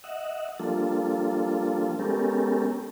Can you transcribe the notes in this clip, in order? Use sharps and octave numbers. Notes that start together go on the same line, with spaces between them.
D#5 E5 F#5
F3 G3 A#3 D4 F4 A4
G#3 B3 C#4 G4 A4 A#4